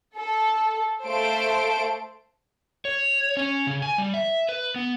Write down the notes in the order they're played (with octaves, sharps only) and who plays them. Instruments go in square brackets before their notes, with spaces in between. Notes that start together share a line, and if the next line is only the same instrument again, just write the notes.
[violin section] A4
A3 A4 C5 F5 A5 D7
[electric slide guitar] C#5
C#4
C#3
G#5
G3
E5
B4
B3